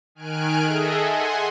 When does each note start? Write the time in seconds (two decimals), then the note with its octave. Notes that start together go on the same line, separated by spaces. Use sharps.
0.15 D#3 G#5 F6 F#6 D7
0.64 G#4 A4 D#5 E5
1.02 F#5 G#5 C6